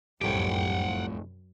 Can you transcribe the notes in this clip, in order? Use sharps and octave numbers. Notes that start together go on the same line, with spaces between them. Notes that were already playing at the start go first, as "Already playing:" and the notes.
F1 C2 F#2 A2 G4 F#5 G5